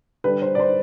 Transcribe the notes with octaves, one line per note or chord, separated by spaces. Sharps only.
D3 G3 D4 B4
C5
D5
C5